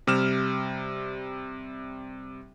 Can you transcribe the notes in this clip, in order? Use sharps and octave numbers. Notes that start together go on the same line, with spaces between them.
C3 G3 F6 E7